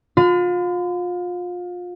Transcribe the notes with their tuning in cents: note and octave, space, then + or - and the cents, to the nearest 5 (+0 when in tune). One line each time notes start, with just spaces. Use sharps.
F4 +30 C6 -45